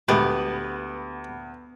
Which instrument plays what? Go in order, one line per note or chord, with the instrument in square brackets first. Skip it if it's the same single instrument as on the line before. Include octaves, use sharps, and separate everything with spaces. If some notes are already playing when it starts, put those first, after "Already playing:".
[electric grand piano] D2 [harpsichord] G#3 A3 F#4 [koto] B3 [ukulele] G4